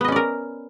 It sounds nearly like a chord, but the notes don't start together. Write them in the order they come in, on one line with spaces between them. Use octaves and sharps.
B3 D#5 C#4 D5 A#4